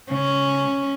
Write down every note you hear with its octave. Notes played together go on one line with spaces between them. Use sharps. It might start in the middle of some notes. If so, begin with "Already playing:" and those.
C#3 C#4